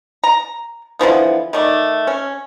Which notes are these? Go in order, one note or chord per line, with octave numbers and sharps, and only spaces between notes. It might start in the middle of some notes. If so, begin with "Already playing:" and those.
A#5
D3 E3 F3 B3
D#3 A3 D5
C#4